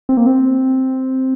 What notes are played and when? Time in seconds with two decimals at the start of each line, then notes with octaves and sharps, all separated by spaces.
0.09 C4
0.17 A#3
0.27 C4